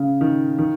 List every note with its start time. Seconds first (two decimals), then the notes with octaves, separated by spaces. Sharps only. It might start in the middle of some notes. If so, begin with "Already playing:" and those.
Already playing: C#3
0.21 D#3
0.58 D#3